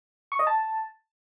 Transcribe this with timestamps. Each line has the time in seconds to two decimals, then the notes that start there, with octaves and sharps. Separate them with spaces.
0.32 C#6
0.39 D#5
0.47 A5